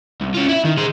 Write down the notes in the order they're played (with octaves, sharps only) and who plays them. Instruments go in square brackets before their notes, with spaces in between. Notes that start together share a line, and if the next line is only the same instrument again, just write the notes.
[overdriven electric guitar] C2
C#4 F4
E4 E5
D#3
G#4 C5